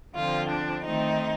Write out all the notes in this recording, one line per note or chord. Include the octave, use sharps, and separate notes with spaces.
D3 F3 C4 F4
D4
D#3 A3 C4 D#4